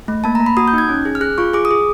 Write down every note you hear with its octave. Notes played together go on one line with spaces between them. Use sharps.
A3
A#3 A5
A#5
A#3
B5
F#4 D#6
G6
D#4 G#6
C#4
G#4
F6
G#4 F#6
F4 C#6
G#4 D6
D#6
G#4